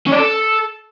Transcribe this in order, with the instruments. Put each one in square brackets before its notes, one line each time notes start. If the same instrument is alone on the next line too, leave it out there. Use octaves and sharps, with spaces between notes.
[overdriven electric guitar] C#4
D5
A4